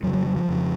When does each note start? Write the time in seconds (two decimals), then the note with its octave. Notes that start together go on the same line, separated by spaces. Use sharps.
0.03 F2 F#3
0.07 C#3
0.14 F#3
0.26 F#3
0.37 F3
0.49 F2 C#3